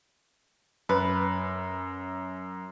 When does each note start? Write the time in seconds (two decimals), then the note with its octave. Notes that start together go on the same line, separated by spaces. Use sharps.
0.89 F#2 B4